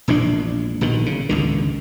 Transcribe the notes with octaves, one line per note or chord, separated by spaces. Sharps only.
E1 A#1 A#2 D4
A#1 B2 D#3
C#3
G#1 C#2 D3